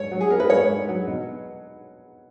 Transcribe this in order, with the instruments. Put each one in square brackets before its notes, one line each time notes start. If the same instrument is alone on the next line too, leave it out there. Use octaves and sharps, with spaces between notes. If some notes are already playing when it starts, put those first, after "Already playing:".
Already playing: [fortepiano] G#2 C#5
F#3
G#4
B3 A#4
B4
G#2 C#5
G#2
F#3
B2